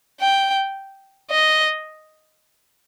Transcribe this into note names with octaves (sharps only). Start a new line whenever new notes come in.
G5
D#5